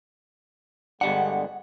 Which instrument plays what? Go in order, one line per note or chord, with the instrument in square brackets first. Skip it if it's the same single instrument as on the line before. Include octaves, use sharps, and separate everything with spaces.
[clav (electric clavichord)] G1 G3 D4 [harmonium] D3 G#3 B3 [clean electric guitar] F#5